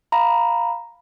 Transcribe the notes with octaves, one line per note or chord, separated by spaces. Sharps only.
F5 A#5 B5